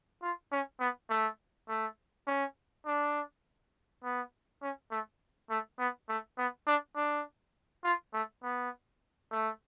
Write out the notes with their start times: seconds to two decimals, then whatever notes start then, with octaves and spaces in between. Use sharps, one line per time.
0.22 F4
0.52 C#4
0.80 B3
1.10 A3
1.69 A3
2.27 C#4
2.86 D4
4.03 B3
4.62 C#4
4.91 A3
5.50 A3
5.79 B3
6.09 A3
6.38 B3
6.67 D4
6.96 D4
7.84 F4
8.13 A3
8.43 B3
9.31 A3